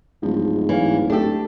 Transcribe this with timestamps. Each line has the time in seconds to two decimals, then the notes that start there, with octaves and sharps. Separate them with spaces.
0.23 D1 G#2 F3
0.69 E3 C#5 F5
1.10 A3 D4 G4 A4